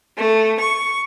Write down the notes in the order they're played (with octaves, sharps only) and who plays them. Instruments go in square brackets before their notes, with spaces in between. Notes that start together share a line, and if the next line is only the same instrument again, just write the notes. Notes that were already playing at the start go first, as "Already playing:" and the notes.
[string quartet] A3
C#6